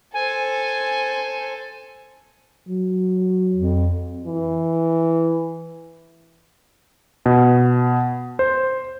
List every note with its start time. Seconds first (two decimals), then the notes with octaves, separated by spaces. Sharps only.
0.13 A4 C5 G#5
2.68 F#3
3.55 F2
4.25 E3
7.26 B2
8.39 C5